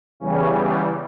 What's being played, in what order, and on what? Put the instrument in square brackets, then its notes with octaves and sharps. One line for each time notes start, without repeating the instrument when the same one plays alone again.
[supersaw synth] E2 C#3 E3 G3 C#4